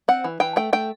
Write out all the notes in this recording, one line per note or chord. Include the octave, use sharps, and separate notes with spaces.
C4 F#5
E3
E3 G5
A3 G5
A3 G5